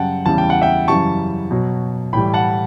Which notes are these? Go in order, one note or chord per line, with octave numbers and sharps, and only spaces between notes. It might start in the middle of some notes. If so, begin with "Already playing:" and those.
Already playing: F#2 C#3 G3 F#5 G5 A5
E2 C#3 E3 G3 A5
G5
F#5
E5 G5
F#2 C#3 E3 G3 A5 C#6
B2 F#3
A2 E3 G3 G5 B5
F#5 A5